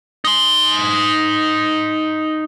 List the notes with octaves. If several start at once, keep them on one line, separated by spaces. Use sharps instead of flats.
D#4 C6